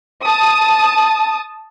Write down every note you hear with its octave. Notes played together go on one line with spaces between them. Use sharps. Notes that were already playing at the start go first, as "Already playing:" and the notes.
A5 D#6